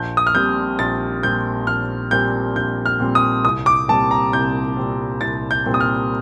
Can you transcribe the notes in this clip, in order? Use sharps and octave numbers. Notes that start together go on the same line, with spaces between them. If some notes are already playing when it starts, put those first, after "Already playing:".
Already playing: A#1 G6
D#6
F6
A#2 G3 C4 G6
A#1 A6
A#2 G3 C4 G6
A#1 F6
A#2 G3 C4 G6
A#1 G6
F6
A#2 G3 C4
D#6
C2 D#6
D6
A#2 G3 C4 A5
A#5
C2 G6
A#2 G3 C4
C2 A6
G6
A#2 G3 C4
D#6
F6